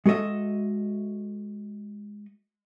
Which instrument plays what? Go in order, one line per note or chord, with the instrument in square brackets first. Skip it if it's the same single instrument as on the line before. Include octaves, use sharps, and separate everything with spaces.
[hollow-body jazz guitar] G#3 F#4 A4 D#5 E5